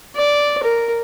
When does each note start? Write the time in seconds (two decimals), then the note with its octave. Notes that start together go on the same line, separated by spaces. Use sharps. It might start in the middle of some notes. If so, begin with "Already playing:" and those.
0.16 D5
0.63 A#4